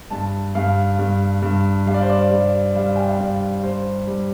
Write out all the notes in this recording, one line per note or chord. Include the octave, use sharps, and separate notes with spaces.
G2 A5
G2 F5
G2
G2
G3 F5
D5
C5
D5
G3
G3 F5
G5
F5
G2 D5
G3 C5
G3